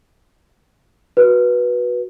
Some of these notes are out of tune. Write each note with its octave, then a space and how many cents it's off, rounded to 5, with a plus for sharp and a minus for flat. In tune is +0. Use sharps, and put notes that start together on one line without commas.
F#4 +0 B4 -15